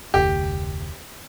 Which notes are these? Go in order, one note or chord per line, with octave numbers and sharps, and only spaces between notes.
F1 D2 G4